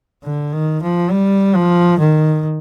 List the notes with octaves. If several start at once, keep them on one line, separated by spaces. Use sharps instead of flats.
D3
D#3
F3
G3
F3
D#3